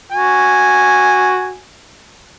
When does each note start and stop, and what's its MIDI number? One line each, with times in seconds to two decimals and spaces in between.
0.12 1.58 66
0.12 1.58 80